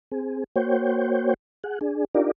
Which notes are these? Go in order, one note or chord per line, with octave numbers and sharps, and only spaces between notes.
C4 G#4
A#3 F#4 C5 C#5 G5
G#4 F#5
D4 G#4
D4 D#4 F4 G4 A#4 D5